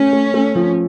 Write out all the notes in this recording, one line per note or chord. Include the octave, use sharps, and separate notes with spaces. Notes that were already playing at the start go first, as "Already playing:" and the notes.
Already playing: A3 C#4
A3
A3
F3